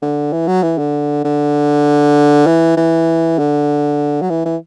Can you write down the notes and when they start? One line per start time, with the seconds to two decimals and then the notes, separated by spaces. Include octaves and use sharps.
0.02 D3
0.32 E3
0.47 F#3
0.63 E3
0.78 D3
1.24 D3
2.46 E3
2.77 E3
3.39 D3
4.21 F#3
4.30 E3
4.45 E3